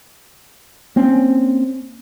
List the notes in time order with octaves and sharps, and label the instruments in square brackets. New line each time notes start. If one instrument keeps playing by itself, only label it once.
[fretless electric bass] A#3 C4 C#4